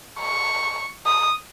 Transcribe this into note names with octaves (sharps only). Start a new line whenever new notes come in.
C#6
D#6